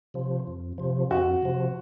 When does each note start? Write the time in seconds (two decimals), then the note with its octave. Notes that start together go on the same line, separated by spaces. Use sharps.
0.14 C3 F3
0.47 F2
0.78 C3 F3
1.11 F2 F#4
1.43 C3 F3